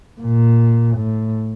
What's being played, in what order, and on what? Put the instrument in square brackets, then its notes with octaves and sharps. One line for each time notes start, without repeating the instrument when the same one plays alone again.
[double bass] A#2
A2